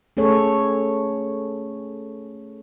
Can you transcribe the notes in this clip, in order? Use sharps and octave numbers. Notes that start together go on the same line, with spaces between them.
A3 C#4 G#4 A4 C#5